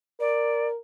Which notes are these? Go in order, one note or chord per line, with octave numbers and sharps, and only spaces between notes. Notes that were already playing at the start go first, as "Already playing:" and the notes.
A#4 D5